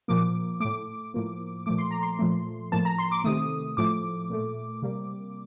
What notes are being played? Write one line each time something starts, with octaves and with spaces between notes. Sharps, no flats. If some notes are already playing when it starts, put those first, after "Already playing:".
A#2 F3 A#3 D6
A2 A3 D6
A2 F3 A#3
A#2 F3 A3 D6
C6
A#5
C6
A#2 F3 A3
A2 F3 A#3 A5
A#5
C6
D6
C3 D#3 A3 D#6
A2 F3 A3 D6
A#2 A3
C3 G3 A#3